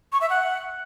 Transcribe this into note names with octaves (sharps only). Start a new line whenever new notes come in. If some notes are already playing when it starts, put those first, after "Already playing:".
C#6
E5
F#5